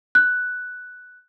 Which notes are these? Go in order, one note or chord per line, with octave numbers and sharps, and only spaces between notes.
F#6